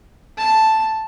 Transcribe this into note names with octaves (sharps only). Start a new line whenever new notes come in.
A5